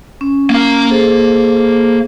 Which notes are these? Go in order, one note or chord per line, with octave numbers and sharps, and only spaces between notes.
C#4
A#3 F5
G#4 A4 C5